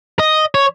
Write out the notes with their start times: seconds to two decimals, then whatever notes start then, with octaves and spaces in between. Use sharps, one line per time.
0.19 D#5
0.55 C#5